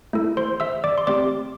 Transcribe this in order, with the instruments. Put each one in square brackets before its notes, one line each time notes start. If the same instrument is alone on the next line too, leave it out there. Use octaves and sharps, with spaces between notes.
[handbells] A3 E4 A4
C5 C6
E5 E6
D5 D6
C6
A3 C4 G4 D5 D6